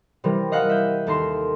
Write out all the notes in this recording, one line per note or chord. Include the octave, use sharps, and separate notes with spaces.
C3 E3 G3 A#4
D#5 F5 F#5 A#5 E6
E5 G6 D#7
D#2 A4 A#5 C6 C7 E7